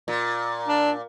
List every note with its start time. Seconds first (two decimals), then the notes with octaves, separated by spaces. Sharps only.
0.08 A#2
0.68 D4